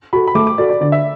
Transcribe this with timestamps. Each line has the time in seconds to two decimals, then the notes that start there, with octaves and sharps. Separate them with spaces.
0.13 F#4 A4 B5
0.28 B5
0.35 A3 D6
0.47 D6
0.58 F#4 A4 D5
0.70 D5
0.81 D3 D5
0.92 E5